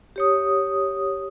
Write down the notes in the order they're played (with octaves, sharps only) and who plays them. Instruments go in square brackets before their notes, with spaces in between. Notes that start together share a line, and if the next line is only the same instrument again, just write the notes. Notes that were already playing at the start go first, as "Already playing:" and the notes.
[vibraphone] G4 C#5 D#6